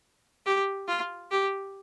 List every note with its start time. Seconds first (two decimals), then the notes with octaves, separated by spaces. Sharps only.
0.46 G4
0.88 F4
1.31 G4